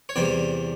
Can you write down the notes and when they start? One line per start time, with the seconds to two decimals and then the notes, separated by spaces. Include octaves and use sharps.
0.09 C#5
0.16 E2 C3 E3 G3 D5